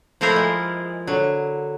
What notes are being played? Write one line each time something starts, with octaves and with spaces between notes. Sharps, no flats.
F3 A3 E4 F4 A#4 C5
G#3
D3 F#3